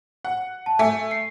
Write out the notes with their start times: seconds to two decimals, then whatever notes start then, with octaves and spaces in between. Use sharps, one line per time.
0.25 F#5
0.66 A5
0.79 A3 G#5
1.11 C7